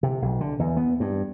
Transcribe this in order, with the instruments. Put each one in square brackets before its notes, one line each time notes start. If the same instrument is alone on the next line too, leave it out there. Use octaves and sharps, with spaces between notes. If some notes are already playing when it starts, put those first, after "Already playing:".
[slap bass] C3
B1
D3
E2
B3
G2